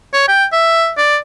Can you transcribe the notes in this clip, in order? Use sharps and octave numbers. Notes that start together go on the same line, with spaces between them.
C#5
G5
E5
D5